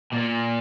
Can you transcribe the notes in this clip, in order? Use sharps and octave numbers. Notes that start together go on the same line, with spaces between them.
A#2